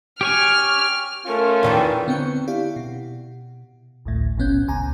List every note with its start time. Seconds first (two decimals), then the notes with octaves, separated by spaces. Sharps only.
0.21 G4 C#5 G#5 F6
1.26 A3 C#4 F4 A#4
1.63 E2 D#3 E3
2.07 D3 B3 C4 C#6 G6
2.48 E4 G4 D5 F5
2.76 B2
4.05 A1 D2 A2
4.38 G1 C2 A#2 B3 C#4 G6
4.68 C#2 G#5 A#5